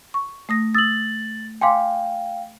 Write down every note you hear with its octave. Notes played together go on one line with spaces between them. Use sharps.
C#6
A3 D#6 A#6
D#6 E6 A6 F#7
F5 G5 G#5 C6 D6